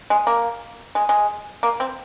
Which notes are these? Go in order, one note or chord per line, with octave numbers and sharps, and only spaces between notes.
G#3
A#3
G#3
G#3
A#3
C4